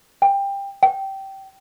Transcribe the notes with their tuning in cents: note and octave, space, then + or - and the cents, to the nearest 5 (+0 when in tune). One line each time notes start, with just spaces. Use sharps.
G5 +20
G5 -15